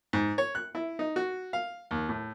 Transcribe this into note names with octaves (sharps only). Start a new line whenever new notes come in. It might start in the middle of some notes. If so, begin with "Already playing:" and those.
G#2
C#5
F#6
E4
D#4
F#4
F5
D#2
A2